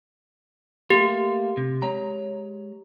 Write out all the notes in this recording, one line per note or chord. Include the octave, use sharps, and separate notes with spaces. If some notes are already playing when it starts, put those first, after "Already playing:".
A3 A#3 G4
C3
G#3 C#5 A#5